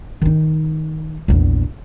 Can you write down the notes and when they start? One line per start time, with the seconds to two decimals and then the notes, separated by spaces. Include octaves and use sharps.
0.22 D#3 D#4
1.28 A#1 E2